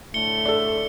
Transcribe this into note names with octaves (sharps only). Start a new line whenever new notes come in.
A2 D3 A3 C#7 G7
D4 A4